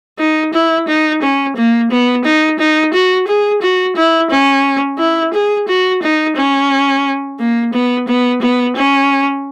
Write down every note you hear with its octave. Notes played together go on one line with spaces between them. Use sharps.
D#4
E4
D#4
C#4
A#3
B3
D#4
D#4
F#4
G#4
F#4
E4
C#4
E4
G#4
F#4
D#4
C#4
A#3
B3
B3
B3
C#4